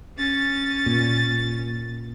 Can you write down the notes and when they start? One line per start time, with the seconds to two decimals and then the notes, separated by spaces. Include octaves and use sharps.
0.18 C#4 A6
0.86 A#2